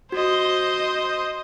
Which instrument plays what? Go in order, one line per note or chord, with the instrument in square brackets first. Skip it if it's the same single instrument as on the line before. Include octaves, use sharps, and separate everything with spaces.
[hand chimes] F#4 [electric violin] C5 D#5